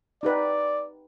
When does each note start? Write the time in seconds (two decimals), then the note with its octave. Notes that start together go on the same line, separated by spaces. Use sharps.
0.23 D#4 G4 B4 D5